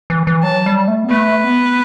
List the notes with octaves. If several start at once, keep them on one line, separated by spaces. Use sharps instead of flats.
E3
E3
F#3 A5
G3
A3
B3
A3 B4
B3